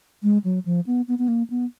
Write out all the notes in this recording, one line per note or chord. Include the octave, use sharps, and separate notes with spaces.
G#3
F#3
F3
B3
B3
B3
A#3
B3